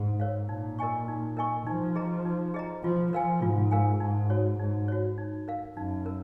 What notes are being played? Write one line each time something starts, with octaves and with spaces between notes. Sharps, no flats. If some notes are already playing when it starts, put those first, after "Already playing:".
Already playing: G#2
A#4 C#5 F5
A#2 D#4
A#4 D#5 G#5 C#6
D#4
A#4 D#5 G#5 C#6
F3 D#4
G#4 D#5 A#5
D#4
G#4 D#5 A#5
F3 F4
F3 A#4 F5 G#5
G#2 F4
A#4 F5 G#5
G#2 D#4
F#4 C#5
G#2 D#4
F#4 C#5
D#4
A#4 F5
F#2 D#4
A#4